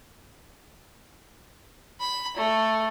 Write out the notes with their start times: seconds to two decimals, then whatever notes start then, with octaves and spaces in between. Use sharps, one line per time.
2.01 B5
2.37 A3